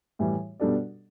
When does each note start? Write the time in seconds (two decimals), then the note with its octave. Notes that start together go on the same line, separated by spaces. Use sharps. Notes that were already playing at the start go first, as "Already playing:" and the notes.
0.19 A2 E3 G3 E4
0.60 B2 G3 D4 A4 D5